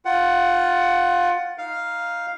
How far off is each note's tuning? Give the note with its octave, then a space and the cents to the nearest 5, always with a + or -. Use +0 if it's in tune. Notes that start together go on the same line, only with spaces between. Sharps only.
F4 +15 F#5 +15
D#4 +10 F5 +0